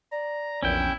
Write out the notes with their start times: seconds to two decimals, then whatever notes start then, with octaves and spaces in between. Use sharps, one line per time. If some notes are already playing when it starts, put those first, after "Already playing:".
0.12 D5 A#5
0.63 A#1 E2 C#4 E4 G5